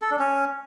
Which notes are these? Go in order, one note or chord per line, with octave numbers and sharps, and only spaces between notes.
A4
D4
C#4